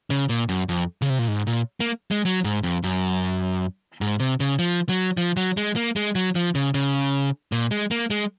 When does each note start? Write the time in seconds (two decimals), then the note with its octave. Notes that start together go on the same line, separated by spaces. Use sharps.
0.10 C#3
0.29 A#2
0.49 F#2
0.69 F2
1.02 C#3
1.10 C3
1.19 A#2
1.28 G#2
1.47 A#2
1.80 A#3
2.11 G#3
2.25 F#3
2.44 G#2
2.63 F2
2.84 F#2
4.01 G#2
4.20 C3
4.40 C#3
4.59 F3
4.89 F#3
5.17 F3
5.37 F#3
5.57 G#3
5.76 A#3
5.96 G#3
6.15 F#3
6.35 F3
6.55 C#3
6.74 C#3
7.52 A#2
7.71 G#3
7.91 A#3
8.10 G#3